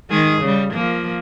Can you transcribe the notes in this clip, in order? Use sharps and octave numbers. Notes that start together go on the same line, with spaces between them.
D#3 G#3 G#4
C#3 G3
F3 A#3